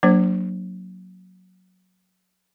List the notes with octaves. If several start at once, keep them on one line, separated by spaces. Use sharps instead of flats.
F#3 A#3 D4 C5